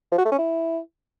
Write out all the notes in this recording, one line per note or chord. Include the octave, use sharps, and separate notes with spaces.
F3
F#4
A3
C#4
E4